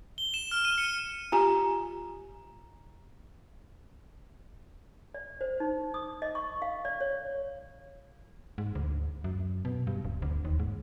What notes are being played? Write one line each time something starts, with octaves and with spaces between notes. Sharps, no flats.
G7
E7
F6
D#7
C#7
F4 G4 G#5 A#5
D5
C5
D#4
D#6
D#5
C#6
F5
D5
C#5
G#2
D2
F#2
B2
G2
D1
D2
D#2
G#2